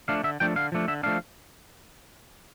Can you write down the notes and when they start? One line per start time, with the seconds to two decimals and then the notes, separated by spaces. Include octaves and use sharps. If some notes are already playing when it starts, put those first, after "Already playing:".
0.08 F3 A3 D4 F5
0.24 D3 E5
0.40 F3 A3 D4 G5
0.56 D3 F5
0.72 F3 A3 D4
0.88 D3 E5
1.03 F3 A3 D4 F5